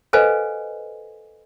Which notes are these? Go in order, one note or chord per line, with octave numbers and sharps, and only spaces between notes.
A4 B4 C5 D#5 F5 G#5